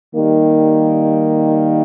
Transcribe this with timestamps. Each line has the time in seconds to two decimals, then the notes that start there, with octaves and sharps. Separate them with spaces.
0.13 D#3 G3 A#3